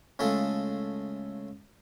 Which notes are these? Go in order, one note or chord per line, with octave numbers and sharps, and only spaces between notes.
C#3 G#3 A3 F4 A4